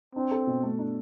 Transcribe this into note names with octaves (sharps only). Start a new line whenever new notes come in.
C4 D4
A4
B2
A3
D4